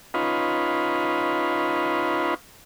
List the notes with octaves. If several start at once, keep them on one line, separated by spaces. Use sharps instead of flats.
C#4 D#4 F4 B4